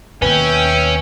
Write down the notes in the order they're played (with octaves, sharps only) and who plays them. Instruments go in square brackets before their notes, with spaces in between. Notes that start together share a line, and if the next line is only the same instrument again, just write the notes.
[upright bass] D#2 B2 [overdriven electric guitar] C#4 [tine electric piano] B4 [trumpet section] E5 G5